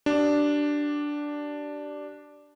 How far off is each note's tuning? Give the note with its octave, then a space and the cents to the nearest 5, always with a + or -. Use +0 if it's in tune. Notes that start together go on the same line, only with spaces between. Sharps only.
D4 +0 G4 -30